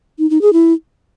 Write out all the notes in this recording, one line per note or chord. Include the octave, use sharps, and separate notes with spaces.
D#4
D#4
G#4
E4